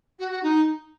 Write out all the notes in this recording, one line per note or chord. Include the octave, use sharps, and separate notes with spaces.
F#4
F#4
D#4